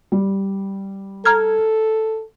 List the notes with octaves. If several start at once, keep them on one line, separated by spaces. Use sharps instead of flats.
G3
A4 A#5 F6 G#6